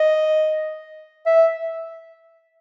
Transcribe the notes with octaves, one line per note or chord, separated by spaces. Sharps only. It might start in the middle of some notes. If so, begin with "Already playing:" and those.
Already playing: D#5
E5